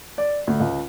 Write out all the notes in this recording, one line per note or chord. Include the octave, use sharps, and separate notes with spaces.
D5
D2
C#2